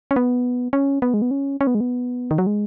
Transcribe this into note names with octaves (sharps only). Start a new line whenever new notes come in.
C#4
B3
C#4
B3
G#3
B3
C#4
C#4
B3
G#3
B3
D#3
F#3
G#3